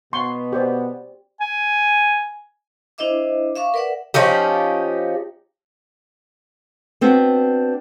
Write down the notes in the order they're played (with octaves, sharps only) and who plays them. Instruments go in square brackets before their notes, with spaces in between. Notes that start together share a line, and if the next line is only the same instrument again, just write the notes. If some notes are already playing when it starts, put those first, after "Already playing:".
[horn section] B2 B3 [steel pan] C6 C#6
[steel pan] G4 C5 D5
[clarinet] G#5
[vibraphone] D4 E4 C5 D#5 E5 D6
E5 F5 C#6 D6
A#4 B4 D5 E5 F#5
[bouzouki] F3 C#4 D#4 G4
[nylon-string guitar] B3 C4 D4 F#4